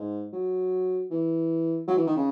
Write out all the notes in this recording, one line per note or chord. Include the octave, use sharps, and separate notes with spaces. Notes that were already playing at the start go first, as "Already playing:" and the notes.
Already playing: G#2
F#3
E3
F#3
E3
D#3
C#3